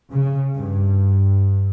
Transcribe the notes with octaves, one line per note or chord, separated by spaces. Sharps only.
C#3
G2